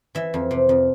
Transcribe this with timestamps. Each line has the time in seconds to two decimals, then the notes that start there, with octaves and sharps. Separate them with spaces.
0.15 E3 E5
0.34 F2
0.51 C3
0.69 F2